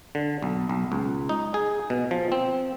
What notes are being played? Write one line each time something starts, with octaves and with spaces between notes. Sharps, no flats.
D3
B1
B1
C#2
D#4
G#4
B2
F3
C4